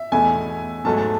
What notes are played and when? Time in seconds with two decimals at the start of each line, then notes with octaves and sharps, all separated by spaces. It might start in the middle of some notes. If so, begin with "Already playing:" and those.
Already playing: E5
0.12 E2 B2 A3 E4 G#5
0.84 G#2 F#3 A3 A5
0.98 A5